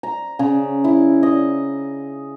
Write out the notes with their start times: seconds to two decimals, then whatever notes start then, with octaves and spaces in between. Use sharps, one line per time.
0.03 A#5
0.39 C#3
0.84 E4
1.23 D#5